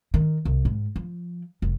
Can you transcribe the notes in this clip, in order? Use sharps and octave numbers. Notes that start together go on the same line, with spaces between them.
D#3
C2
G#2
F3
F1